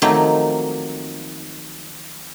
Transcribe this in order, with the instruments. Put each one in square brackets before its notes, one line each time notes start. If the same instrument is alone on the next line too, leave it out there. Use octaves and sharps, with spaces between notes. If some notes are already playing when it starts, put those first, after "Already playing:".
[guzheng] D#3 F3 F#3 A3 A#3 C4